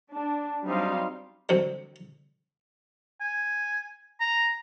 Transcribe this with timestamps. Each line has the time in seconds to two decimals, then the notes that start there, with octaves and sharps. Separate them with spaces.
0.12 D4
0.65 F#3 G3 C4 D#4 F5 C6
1.49 D3 F#3 C4
3.21 G#5
4.21 A#5